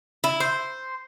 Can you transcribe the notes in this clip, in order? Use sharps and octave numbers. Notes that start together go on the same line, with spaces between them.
E4
C5